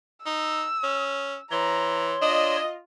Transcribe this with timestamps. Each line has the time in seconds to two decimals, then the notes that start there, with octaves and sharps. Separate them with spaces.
0.26 D#4 E6
0.84 C#4
1.52 E3 C#5 A#5 C6
2.22 D4 F4 D#5